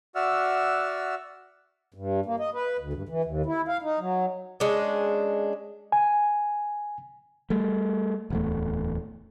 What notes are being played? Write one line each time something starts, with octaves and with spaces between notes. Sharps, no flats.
F#4 D5 E5 F#5 E6 F6
G2
A#3
D#5
B4
D2
G2
E3
D#2
E4
F5
D#4
F#3
G#3 C#4 D4
G#5
G3 A3
D1 E2 A3